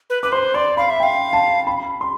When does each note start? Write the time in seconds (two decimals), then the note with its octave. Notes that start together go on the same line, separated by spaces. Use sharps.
0.10 B4
0.23 B4 D6
0.32 C5 C6
0.54 D5 C6
0.77 F5 B5
0.90 E5
1.00 F5 G5
1.33 A5
1.67 B5
2.01 C6